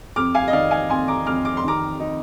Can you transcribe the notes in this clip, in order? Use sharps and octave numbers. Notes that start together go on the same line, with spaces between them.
F2 D6 F6
F5 G#5
D#5
D#3 D5 F5
F5 G#5
F2 G#5 C6
A#5 D6
F2 D6 F6
D6
C6
D#3 A#5 D6
D#4